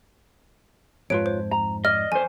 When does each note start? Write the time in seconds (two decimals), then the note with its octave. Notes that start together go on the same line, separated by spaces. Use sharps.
1.10 F2 G#2 F4 B4 C#5 D7
1.26 C5
1.51 A#5
1.85 D5 D#5 F6
2.12 F2 C5 G#5